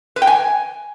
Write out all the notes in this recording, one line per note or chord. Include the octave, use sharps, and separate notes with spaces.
B4
G5
G#5